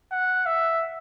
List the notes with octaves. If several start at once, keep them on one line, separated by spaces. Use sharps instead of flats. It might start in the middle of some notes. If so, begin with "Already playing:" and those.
F#5
E5